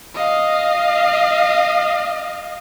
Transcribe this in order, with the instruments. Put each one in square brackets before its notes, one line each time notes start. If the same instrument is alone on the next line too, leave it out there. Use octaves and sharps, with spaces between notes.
[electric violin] D#5 F5